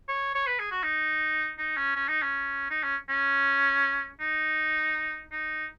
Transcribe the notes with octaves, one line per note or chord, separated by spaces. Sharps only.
C#5
C#5
B4
G#4
F#4
D#4
D#4
C#4
C#4
D#4
C#4
D#4
C#4
C#4
D#4
D#4